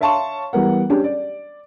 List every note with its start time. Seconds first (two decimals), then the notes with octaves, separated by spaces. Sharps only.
0.01 C#5 E5 F5 A5 C6 C#6
0.53 E3 G3 B3 A#4 F#5
0.90 C#4 D4 G4
1.04 D5